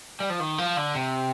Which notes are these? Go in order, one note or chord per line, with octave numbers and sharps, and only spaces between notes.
G3
F3
D#3
F3
D3
C3